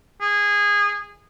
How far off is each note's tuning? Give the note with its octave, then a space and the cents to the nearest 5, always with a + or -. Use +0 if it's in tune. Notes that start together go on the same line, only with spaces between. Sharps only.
G#4 -20